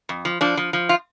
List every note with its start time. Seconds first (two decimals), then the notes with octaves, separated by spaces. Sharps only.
0.09 F2
0.25 F3
0.41 F3 D4
0.57 F3
0.73 F3
0.89 F4